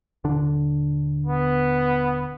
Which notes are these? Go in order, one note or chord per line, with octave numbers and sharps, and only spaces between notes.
D#1 D3 D4
B3